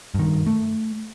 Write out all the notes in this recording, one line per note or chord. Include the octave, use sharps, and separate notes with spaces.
G2 D#3
A3